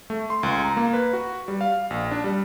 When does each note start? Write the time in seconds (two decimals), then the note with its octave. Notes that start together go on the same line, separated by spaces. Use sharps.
0.10 A3
0.30 C6
0.43 C#2
0.64 A#5
0.77 A#3
0.93 B4
1.13 F#4
1.48 G3
1.61 F5
1.90 A#1
2.11 D4
2.24 G3